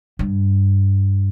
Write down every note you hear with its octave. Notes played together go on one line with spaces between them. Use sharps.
G2